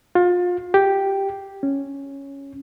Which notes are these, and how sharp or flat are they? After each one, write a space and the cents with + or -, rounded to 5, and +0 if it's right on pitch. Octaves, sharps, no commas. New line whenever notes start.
F4 +30
G4 +0
C#4 +0